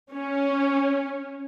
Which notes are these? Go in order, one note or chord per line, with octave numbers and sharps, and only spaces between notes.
C#4